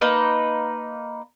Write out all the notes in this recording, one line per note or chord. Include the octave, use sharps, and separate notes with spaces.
A#3 D#4 B4